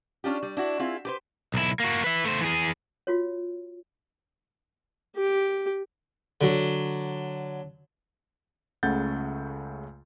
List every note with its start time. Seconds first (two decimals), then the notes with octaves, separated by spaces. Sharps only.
0.24 C#4 D4 F4 G4
0.43 G3
0.57 D4 E4 F#4
0.80 C4 E4 F4 G#4
1.05 G4 B4 C5
1.54 B1 E4
1.80 A#3 F#4
2.04 B4 E5
2.24 A3 C5
2.41 E3 G#4
3.07 F4 F#4 C#5
5.16 G4
6.41 D3 F#3
8.83 C#2 C#3 A3 F#5 G6 A6